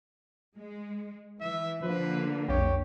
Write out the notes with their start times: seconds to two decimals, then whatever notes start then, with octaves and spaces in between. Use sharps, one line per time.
0.57 G#3
1.41 E3 E5
1.82 D3 F3 A#3 B4
2.49 B1 F2 G4 C#5